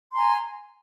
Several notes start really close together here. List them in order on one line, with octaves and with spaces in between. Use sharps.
C6 A#5 G#5